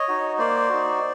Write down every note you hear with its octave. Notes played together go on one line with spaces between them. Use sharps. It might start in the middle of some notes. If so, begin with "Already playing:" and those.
Already playing: C#5 D#5
D#4 F#4
A#3 C5 D5
D#4 F#4